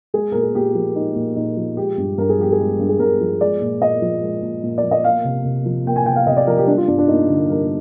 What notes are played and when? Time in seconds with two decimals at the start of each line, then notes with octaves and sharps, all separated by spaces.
0.14 G#3 G#4
0.32 A#2 A#4
0.43 G#4
0.55 A#2 G4
0.75 F3
0.96 G#3 D#4
1.16 A#2
1.36 A#2 D#4
1.57 F3
1.77 G#3 G4
1.98 G2
2.18 G2 A#4
2.30 G#4
2.39 F3 G4
2.52 G#4
2.59 G#3
2.79 G2
2.89 G#4
3.00 G2 A#4
3.21 F3
3.41 G#3 D5
3.62 A#2
3.82 A#2 D#5
4.02 F3
4.22 G#3
4.43 A#2
4.64 A#2
4.78 D5
4.83 F3
4.91 D#5
5.04 A#3 F5
5.24 C3
5.45 C3
5.66 F3
5.86 A#3 G5
5.96 G#5
6.06 C3 G5
6.16 F5
6.27 C3 D#5
6.37 D5
6.47 F3 A#4
6.58 G4
6.67 G3 D4
6.78 F4
6.88 G2 D4
6.98 D4
7.08 A#3 D#4
7.29 D3
7.49 G3 A#4